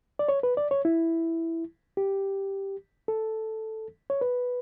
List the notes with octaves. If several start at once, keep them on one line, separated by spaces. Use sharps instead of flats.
D5
C#5
B4
D5
C#5
E4
G4
A4
C#5
B4